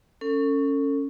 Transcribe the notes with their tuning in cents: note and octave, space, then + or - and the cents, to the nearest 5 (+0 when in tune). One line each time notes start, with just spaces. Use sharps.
C#4 +0 A4 +35